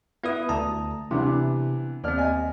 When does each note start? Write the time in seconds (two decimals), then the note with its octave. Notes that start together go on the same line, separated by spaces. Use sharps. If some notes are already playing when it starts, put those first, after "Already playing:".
0.23 B3 E4 B4 D#6
0.49 D2 A5 A#5 D#6
1.11 C3 E3 B3 D4
2.04 D#2 C4 D5 F6
2.18 D#5 G#5